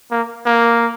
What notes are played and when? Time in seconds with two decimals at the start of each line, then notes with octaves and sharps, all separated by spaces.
0.11 A#3
0.46 A#3